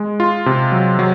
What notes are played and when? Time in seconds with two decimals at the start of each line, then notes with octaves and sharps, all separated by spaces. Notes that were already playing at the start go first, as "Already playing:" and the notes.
Already playing: G#3
0.20 F4
0.46 C3
0.72 F#3
0.99 F#3